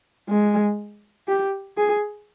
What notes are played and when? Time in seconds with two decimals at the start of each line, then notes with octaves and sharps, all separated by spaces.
0.29 G#3
1.28 G4
1.78 G#4